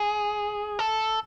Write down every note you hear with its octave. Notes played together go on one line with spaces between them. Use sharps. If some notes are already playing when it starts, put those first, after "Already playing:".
Already playing: G#4
A4